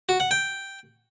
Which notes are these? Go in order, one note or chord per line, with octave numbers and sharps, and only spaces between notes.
F#4
F#5
G5